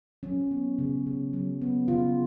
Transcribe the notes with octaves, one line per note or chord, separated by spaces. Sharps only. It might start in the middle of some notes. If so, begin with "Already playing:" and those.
F#3 C#4
B3
C#3
C#3
F#3
B3
C#3 F4